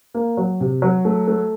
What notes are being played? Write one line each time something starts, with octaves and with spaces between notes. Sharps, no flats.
A#3
F#3
C3
F#3
A3
A3